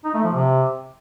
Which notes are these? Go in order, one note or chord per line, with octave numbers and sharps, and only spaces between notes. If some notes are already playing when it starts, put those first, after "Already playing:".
D#4
A3
F3
C3